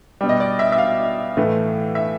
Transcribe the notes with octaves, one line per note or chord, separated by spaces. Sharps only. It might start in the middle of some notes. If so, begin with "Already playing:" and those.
B2 G3
D#5
D5
E5
E5
F5
A2 E3 A3
E5